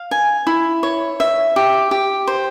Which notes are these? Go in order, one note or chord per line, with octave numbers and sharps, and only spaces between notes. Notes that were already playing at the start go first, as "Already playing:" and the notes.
Already playing: F5
G#5
E4
C#5
E5
G4
G4
C5